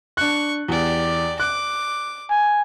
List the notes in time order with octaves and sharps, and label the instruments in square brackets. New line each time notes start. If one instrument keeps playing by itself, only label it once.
[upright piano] D4 F#6 [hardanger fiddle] C#6
[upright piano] E2 [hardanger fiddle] G4 D5
[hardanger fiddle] D6 [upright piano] F#6
[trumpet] G#5